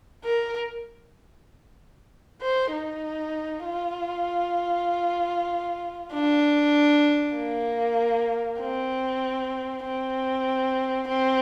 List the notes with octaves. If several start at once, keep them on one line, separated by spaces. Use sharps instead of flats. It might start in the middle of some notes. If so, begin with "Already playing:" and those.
A#4
C5
D#4
F4
D4
A#3
C4
C4
C4